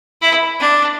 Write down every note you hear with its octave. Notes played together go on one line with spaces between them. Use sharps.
E4
D4